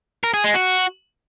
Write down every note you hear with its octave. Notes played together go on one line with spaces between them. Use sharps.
A#4
G#4
G#3
F#4